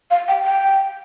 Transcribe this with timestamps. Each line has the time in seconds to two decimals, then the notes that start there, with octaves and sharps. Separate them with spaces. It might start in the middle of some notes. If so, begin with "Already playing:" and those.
0.11 F5
0.28 G5
0.45 G5